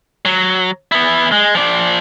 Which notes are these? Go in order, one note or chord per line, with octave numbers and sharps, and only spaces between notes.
F#3
B3 E4
G#3
F3 D5